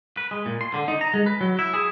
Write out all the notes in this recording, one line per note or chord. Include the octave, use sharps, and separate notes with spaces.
B4
G#3
A#2
C6
D3
D#4
A#5
G#3
B4
F#3
E4
G#4